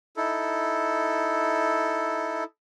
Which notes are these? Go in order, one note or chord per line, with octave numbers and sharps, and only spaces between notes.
D#4 E4 A4